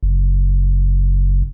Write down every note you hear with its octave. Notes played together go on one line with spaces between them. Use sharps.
F#1